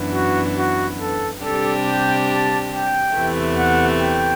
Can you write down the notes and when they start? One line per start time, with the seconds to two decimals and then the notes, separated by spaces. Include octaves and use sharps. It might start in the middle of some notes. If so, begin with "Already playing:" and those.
Already playing: F#2 E3 B3 D4
0.14 F#4
0.57 F#4
1.01 A4
1.43 C3 G3 D4 G4 A4
1.86 G5
2.29 A5
2.72 G5
3.15 E2 C3 E3 A3
3.58 F#5
4.01 G5